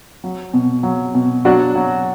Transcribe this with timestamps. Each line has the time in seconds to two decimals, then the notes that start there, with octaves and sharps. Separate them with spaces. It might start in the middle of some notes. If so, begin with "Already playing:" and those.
0.24 F#3
0.54 B2
0.83 F#3
1.14 B2
1.45 F#3 D4 F#4
1.75 F#3